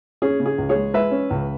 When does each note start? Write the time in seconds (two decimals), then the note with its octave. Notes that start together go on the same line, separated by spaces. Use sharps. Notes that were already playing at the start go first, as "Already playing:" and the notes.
0.22 C#4 G#4
0.40 C#3
0.46 G#4
0.58 C#2
0.69 G#4 C#5
0.75 G#3
0.94 G#3 B4 E5
1.11 C#4
1.30 C#2